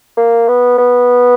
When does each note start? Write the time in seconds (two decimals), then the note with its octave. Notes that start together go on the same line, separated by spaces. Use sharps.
0.17 A#3
0.48 B3
0.78 B3